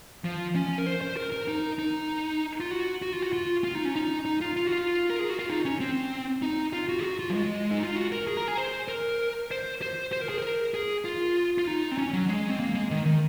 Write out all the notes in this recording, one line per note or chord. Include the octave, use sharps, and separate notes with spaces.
F3
C#4
A#4
C5
C5
A#4
A#4
D#4
D#4
F4
F#4
F#4
F4
F#4
F4
F4
D#4
C#4
D#4
D#4
F4
F4
F#4
F4
A#4
G#4
F#4
F4
D#4
C#4
C4
D#4
F4
F#4
G#4
F#4
F4
F#3
G#3
D#4
F4
F#4
A#4
G#4
A#4
G#4
C5
A#4
C5
C5
C5
A#4
G#4
A#4
G#4
F4
F4
D#4
C4
C#4
F#3
G#3
C4
A#3
G#3
D#3
D#3